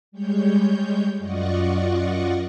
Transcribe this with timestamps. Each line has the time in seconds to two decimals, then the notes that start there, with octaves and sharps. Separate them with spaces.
0.12 G3 G#3 C#5 G6
1.18 F#2 F4 D5 D#5 F#5 C#6